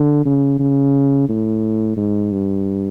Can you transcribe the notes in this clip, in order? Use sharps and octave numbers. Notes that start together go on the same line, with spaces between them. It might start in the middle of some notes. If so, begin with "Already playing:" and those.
Already playing: D3
C#3
C#3
A2
G#2
G2